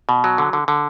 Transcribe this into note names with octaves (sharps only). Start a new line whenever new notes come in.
B2
F#3
D3
D3
D3